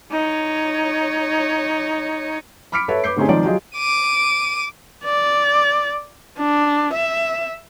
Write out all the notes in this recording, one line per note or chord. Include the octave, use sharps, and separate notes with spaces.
D#4 C#5
B5 D6 F6 B6 C#7 D7
A4 B4 C#5 E5
B4 D6 G6 C7
D3 A3 C4 C#4 D#4 G#4
C#2 D#3 F3 C4 D5 D7
F#3 F4 G4 G#4 D#5
D6 D#7
D5
D4
E5